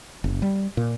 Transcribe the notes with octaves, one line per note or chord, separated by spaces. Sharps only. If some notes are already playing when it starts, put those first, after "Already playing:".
F#1
G3
A#2